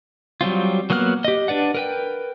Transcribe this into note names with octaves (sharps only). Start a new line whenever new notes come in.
F#3 G3 C4 F4
F#3 A#3 B3 F#5 F6
G4 D#5
D4 B4 D5 F#5
A#4 B4 G5